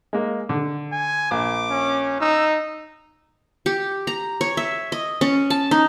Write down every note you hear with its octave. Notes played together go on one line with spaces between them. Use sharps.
G#3 A#3
D3
G#5
A#1 D6
C#4
D#4 E6
G4
A#5
C#5
E5
D#5
C#4
A5
D#4